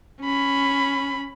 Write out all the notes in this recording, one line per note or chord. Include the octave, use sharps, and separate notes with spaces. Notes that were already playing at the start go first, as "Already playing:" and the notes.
C#4 B5